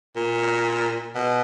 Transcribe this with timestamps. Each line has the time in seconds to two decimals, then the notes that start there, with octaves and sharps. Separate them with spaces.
0.16 A#2
1.15 B2